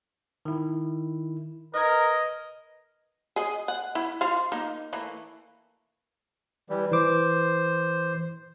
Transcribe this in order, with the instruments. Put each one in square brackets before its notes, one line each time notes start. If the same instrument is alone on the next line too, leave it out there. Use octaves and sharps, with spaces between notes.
[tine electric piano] D#3 E4
[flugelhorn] A#4 [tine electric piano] B4 G#6 [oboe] D#5
[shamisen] G#4 D#5
F#5
E4
F4 C5 F5
A#3 D#4
E3 A3 A#3
[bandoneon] E3 G3
[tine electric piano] E3 D6 [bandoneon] C5